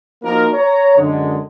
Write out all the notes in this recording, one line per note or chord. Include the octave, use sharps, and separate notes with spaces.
F3 A#3 D#4 F#4 A#4
C#5 A#5
F#2 D3 G#3